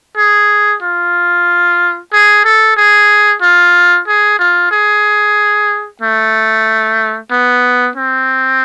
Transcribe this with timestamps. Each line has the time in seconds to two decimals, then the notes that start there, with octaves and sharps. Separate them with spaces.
0.18 G#4
0.83 F4
2.13 G#4
2.45 A4
2.77 G#4
3.42 F4
4.07 G#4
4.39 F4
4.71 G#4
6.02 A3
7.31 B3
7.96 C4